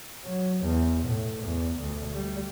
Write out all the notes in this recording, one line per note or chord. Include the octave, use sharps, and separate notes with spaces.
F#3
E2
A2
E2
D2
G3